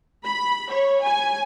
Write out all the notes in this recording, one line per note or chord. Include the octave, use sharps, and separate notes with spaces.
B5
C#5
G#5